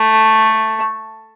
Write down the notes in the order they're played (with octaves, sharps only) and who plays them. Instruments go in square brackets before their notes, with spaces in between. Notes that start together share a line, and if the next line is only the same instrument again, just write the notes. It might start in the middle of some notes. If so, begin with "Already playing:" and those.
Already playing: [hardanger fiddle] A3